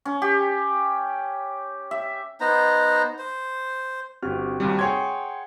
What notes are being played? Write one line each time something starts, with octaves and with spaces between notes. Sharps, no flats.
C#4
G4
E5
B3 D#4 C5 A#5
C5
G1 C4 F#4 G4 F6
D#2 C3 G3
G#4 C#5 F#5 G5 C6 G#6